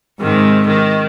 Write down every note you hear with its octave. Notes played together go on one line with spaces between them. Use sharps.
G#2 C3 D#3
D#3